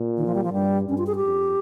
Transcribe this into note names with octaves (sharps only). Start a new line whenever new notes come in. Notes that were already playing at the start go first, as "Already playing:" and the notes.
Already playing: A#2
D#3
F3
G3
F3
G2 G3
G2 C#4
F4
G#4
G4
F2